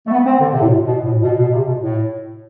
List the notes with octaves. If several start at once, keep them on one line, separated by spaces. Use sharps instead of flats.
A3
B3
C4
D3
C3
A2
B2
B2
A2
B2
B2
C3
B2
A2